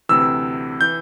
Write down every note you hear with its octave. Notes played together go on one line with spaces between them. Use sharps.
D2 C3 E3 E6
E3 G6